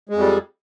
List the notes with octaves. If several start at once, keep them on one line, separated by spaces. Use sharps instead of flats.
F2 G3 G#3